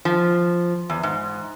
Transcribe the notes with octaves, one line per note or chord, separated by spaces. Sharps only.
F3
E2
G#2